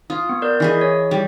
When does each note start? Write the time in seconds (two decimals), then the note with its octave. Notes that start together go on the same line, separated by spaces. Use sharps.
0.10 F4 D#6
0.29 B3
0.42 A#4 D5 G6
0.60 E3 G#4 D#5
0.81 C#5
1.11 G3